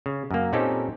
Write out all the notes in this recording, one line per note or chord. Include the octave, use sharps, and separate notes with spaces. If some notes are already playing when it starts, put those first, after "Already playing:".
C#3
F#2 A#3
A#2 C4 C#4 D#4 G4 A4